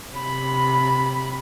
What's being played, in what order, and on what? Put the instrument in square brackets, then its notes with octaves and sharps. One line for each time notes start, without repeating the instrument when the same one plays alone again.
[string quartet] C3 B5